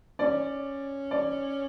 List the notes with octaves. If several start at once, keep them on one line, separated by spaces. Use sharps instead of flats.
C#4 D5
D5